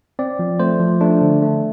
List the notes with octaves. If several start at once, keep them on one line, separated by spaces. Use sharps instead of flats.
C4 D5
F3
A3 C5
F3
A3 D4
D3
A3